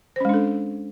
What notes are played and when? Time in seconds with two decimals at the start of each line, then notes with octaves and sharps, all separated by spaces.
0.16 C5
0.20 C#4
0.25 G#3
0.29 D4
0.34 A4